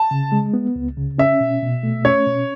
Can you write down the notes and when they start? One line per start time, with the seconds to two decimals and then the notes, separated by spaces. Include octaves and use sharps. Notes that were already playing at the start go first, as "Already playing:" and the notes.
Already playing: A5
0.11 C#3
0.32 G#3
0.54 B3
0.76 C#2
0.97 C#3
1.18 C#4 E5
1.41 B2
1.62 B2
1.83 A3
2.05 C#4 C#5
2.27 B2